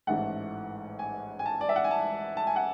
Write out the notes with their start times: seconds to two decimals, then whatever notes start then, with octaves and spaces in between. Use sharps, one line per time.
0.07 A1 G#2 E3 A3 F#5
0.99 G#5
1.39 G#5
1.46 A5
1.61 D5
1.69 E5
1.76 F#5
1.84 G#5
1.91 A5
2.37 A5
2.47 G#5
2.56 F#5